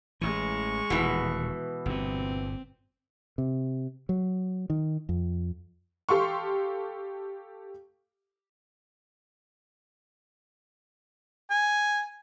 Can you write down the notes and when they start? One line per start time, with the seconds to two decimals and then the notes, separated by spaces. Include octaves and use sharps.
0.21 A1 E3 G#3 C#6
0.90 D#1 B2 E3
1.86 G1 A#2 C4
3.38 C3
4.09 F#3
4.70 D#3
5.09 F2
6.09 G4 A4 F5 C6 C#6
11.51 G#5